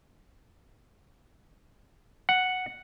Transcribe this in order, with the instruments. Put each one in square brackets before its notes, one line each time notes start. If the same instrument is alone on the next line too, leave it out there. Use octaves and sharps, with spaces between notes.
[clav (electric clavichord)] F#5